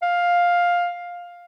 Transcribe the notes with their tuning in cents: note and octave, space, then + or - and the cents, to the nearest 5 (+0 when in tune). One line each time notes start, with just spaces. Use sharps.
F5 +10